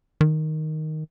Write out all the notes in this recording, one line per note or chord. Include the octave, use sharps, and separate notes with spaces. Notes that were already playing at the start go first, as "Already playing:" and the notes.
D#3